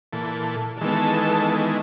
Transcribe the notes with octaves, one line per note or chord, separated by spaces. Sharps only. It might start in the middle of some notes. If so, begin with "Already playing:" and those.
A#2 E3 A4
D#3 E3 G#3 B3 A4 A5